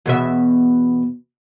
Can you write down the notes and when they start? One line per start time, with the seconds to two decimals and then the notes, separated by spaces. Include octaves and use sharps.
0.06 E2 B2 E5